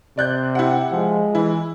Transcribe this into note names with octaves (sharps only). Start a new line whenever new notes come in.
C3 D5 F#6 G6
E4 G4 F#5
F3 G#3
E3 E4